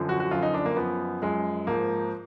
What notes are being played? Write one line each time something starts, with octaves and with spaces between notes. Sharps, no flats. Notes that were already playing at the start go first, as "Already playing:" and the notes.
Already playing: F#2 D3 F3
F#4
F#4
F#2 D3 F3 F4
D#4
D4
A#3
F#2 F3 B3
F#2 F3 G#3
G#2 F3 A#3